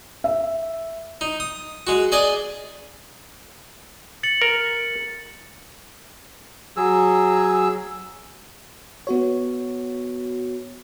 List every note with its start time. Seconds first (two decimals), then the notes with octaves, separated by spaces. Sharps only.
0.24 E5
1.21 D#4
1.40 D#6
1.87 G#3 F#4
2.12 G#4 D5 D#5 G#5
4.23 A6 C#7 F#7
4.42 A#4
6.77 F#3 G#4 E6
9.07 B3 F#4 C#5